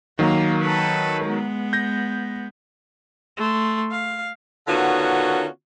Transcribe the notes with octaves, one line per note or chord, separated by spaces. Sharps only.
D#3 F#3 A#3
A4 B4
G#3 B3
G6 A#6
A3 C6
F5
D3 D#3 B3 C#4 F4 F#4